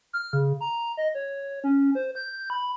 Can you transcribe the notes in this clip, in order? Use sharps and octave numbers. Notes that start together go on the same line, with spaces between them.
F6
C#3
A#5
D#5
C#5
C#4
C5
G6
B5